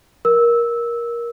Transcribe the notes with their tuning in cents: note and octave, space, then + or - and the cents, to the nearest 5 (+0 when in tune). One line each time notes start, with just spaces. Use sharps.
A#4 +15 E6 -10